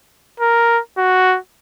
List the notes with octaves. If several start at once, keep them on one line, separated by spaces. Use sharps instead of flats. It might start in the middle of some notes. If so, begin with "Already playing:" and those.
A#4
F#4